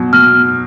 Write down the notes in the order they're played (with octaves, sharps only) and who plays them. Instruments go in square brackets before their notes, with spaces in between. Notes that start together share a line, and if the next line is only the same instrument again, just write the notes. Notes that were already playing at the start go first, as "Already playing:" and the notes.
Already playing: [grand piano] B2 F#3
[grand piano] B2 [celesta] F6